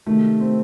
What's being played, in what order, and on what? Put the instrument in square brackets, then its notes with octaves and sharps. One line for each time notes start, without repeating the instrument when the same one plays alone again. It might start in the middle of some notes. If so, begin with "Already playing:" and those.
[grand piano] C3 D#3 A3
C4